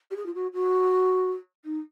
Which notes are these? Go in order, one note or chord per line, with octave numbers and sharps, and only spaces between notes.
G4
G#4
F4
F#4
F#4
D#4